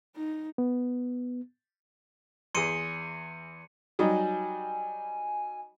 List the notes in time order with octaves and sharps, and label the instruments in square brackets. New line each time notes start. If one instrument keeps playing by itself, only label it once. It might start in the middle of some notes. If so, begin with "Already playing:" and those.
[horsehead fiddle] D#4
[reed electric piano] B3
[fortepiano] E2 G#4 [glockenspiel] C6 C#7 D#7
[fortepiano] F#3 G3 D#4 [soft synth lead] G#5